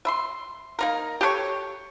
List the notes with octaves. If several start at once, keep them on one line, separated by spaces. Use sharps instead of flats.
E5 B5 C6
A#3 D#4 A#4
G4 A4 B4 C#5